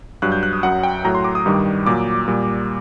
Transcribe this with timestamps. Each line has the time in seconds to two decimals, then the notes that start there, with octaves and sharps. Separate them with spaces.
0.22 G2 F#3 F#6
0.32 G6
0.43 F#6
0.53 D#6
0.63 F#2 F#3 F#5
0.83 G5
1.04 A2 F#3 A#5
1.15 C6
1.24 D6
1.35 D#6
1.46 G2 D#3 G3
1.86 A#2 F#3 D6
2.28 A#2 G3